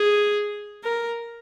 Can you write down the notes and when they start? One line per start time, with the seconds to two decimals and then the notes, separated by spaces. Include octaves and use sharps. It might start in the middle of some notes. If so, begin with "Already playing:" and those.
Already playing: G#4
0.84 A#4